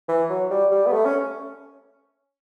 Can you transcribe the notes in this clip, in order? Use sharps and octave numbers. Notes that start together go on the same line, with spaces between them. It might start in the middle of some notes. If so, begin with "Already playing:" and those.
E3
F#3
G3
G3
B3
A3
C#4